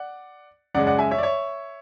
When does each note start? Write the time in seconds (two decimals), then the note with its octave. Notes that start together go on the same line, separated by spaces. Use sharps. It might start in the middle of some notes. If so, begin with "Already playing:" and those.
Already playing: D5 F#5
0.75 F#2 C#3 G#3 D5 F#5
0.87 D5 F#5
0.99 E5 G#5
1.11 C#5 E5
1.18 D5
1.23 C#5 E5